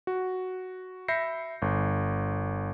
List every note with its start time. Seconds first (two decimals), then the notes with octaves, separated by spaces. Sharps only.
0.07 F#4
1.08 E5 B5 G6 A#6 C7 C#7
1.62 G1